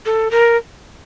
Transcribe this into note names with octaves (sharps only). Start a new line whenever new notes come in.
A4
A#4